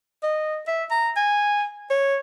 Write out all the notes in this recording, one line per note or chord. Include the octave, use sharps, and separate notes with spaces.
D#5
E5
A#5
G#5
C#5